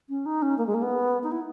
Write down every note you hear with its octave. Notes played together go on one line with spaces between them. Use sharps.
C#4
D#4
C#4
A#3
G#3
A#3
B3
D#4
E4